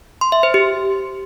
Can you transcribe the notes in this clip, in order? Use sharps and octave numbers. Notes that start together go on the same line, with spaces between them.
C6
E5
C5
G4